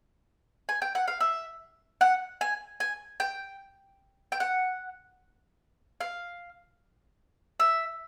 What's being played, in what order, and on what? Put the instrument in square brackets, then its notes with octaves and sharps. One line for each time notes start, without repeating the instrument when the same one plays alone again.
[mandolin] G#5
G5
F#5
F5
E5
F#5
G#5
G#5
G5
G5
F#5
F5
E5